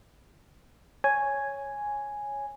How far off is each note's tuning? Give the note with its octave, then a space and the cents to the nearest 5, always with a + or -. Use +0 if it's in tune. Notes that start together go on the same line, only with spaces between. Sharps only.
C#5 +0 G#5 +0